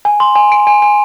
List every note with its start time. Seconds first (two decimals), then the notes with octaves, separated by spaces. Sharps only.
0.05 G#5
0.20 C6
0.35 G#5
0.52 D7
0.67 G#5
0.82 G#5